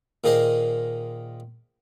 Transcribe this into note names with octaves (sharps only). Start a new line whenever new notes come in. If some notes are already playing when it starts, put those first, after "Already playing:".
A#2 D#3 G#4 C5 D#5